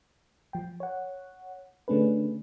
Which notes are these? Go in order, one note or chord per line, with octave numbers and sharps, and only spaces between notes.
F3 G5
C#5 F#5
D3 A3 C#4 D4 G#4 B4